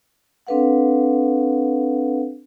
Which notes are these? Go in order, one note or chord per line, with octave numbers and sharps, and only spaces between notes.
C4 D4 A4 B4 F5 F#5